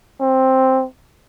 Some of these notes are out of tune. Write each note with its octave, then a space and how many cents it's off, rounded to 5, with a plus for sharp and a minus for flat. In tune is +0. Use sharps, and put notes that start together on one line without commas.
C4 +5